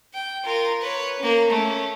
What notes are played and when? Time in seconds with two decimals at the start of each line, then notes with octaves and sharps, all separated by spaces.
0.14 G5
0.45 F4 A#4
0.81 B4 C#5
1.19 A#3 C#4
1.50 A3 C#4